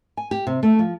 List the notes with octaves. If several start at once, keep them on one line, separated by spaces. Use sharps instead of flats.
G#5
G4
C3
A3
F3